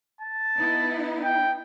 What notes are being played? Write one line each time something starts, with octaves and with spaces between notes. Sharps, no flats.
A5
B3 D#4 E4
G5